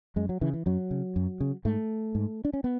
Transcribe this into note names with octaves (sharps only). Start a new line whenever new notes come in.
F#2 G#3
F#3
C#3 E3
E3
F#2 F#3
C#3
F#2
C#3
G#2 A3
G#2
D4
C#4
B3